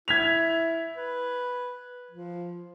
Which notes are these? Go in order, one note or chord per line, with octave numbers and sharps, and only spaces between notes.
E4 G#6 B6 F7
B4
F3